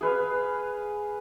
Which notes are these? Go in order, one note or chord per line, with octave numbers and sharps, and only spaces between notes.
G#4 B4 F5